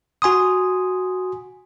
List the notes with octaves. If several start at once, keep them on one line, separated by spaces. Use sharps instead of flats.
F#4 G#5 C6 D#6